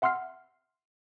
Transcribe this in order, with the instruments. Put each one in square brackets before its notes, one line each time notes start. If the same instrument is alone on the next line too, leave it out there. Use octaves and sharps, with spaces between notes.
[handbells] E5 F#5 C6 E6 F6 C7